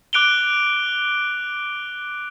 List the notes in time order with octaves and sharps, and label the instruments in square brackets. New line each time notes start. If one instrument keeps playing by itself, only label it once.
[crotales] D6 F#6 D7 F7 G7